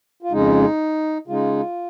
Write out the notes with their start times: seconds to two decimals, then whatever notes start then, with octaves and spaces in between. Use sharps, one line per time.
0.23 F4
0.32 F2 C#3 G#3 D#4
1.28 C#3 G#3 D#4 F4